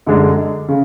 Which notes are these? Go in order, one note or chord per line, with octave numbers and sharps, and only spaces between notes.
F#2 D3 G#3 D4
C#3